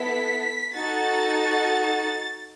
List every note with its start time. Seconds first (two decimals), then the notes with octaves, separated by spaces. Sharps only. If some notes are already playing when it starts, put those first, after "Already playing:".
Already playing: B3 E4 A4 B6
0.75 D#4 F#4 A4 A6